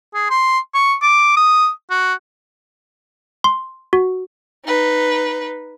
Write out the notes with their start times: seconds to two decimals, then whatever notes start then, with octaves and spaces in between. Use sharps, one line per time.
0.14 G#4
0.30 C6
0.75 C#6
1.02 D6
1.36 D#6
1.90 F#4
3.44 C6
3.93 F#4
4.65 D#4 B4